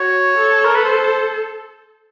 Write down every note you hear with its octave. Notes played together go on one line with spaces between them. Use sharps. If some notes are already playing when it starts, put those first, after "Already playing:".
Already playing: F#4 C#5
A4
A#4
B4
C5